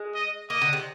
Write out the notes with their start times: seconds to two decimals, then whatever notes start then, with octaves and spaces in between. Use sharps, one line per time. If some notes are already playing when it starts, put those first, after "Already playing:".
Already playing: G#3
0.15 D#5
0.49 A#3 D#5
0.62 D3
0.73 C3